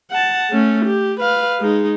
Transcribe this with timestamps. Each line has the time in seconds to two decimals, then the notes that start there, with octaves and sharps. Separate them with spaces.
0.11 F#5 A5
0.50 A3 C#4
0.85 G4
1.20 B4 F5
1.60 G#3 D#4